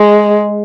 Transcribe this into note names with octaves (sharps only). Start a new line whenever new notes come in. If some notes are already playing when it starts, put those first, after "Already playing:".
Already playing: G#3